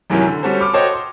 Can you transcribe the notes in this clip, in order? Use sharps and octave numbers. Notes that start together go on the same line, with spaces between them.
F#2 C3 D#3 E3 F#3 C#4
D3
G3 C#4 F#4 A4 C5
B5 D6 F6
F#4 A4 C5 C#5 D#5 G5
C6